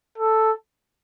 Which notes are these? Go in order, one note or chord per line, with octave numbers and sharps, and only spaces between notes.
A4